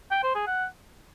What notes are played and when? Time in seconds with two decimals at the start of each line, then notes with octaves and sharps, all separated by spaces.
0.11 G5
0.23 C5
0.35 G#4
0.47 F#5